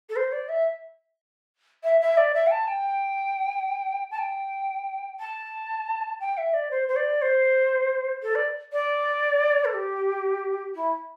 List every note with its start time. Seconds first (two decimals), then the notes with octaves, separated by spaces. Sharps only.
0.09 A4
0.15 C5
0.32 D5
0.48 E5
1.83 E5
2.00 E5
2.17 D5
2.34 E5
2.46 G5
2.51 A5
2.67 G5
4.10 A5
4.18 G5
5.19 A5
6.20 G5
6.37 E5
6.53 D5
6.70 C5
6.88 C5
6.96 D5
7.21 C5
8.22 A4
8.35 D5
8.72 D5
9.64 A4
9.73 G4
10.75 E4